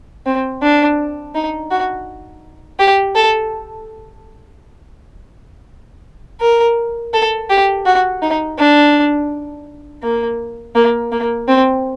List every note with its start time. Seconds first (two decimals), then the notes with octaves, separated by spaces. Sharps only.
0.26 C4
0.62 D4
1.35 D#4
1.71 F#4
2.79 G4
3.15 A4
6.41 A#4
7.14 A4
7.50 G4
7.86 F#4
8.22 D#4
8.58 D4
10.03 A#3
10.75 A#3
11.12 A#3
11.48 C4